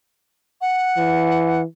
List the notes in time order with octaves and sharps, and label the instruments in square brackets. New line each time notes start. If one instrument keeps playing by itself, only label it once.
[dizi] F#5
[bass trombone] E3